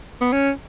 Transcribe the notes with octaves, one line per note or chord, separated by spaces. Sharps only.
B3
C#4